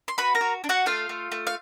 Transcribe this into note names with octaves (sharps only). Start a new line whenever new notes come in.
C6
F#4 B4 B5
A#4 A#5
F#4
D4
F#4 F#5
A3 F4 F5
A3
A3
F5